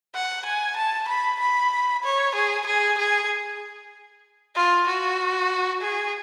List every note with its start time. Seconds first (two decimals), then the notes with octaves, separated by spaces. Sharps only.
0.15 F#5
0.45 G#5
0.77 A5
1.08 B5
1.40 B5
2.04 C#5
2.35 G#4
2.66 G#4
2.98 G#4
4.55 F4
4.87 F#4
5.81 G#4